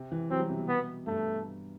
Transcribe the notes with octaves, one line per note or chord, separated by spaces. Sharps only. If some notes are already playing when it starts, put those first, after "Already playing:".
Already playing: C3
E3
F#3 C4
G3
C3
B2
B3
G2 A3